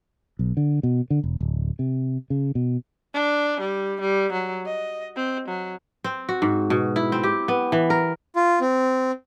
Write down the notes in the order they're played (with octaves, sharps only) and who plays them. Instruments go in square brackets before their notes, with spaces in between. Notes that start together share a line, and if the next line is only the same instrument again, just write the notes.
[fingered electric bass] B1
D3
B2
D3
E1
D1
C3
C#3
B2
[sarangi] D4
G3
G3
F#3
D#5
C4
F#3
[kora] C4
F#4
G#2
B2
E4
C4
G4
B3
E3
A#4
[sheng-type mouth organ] F4
C4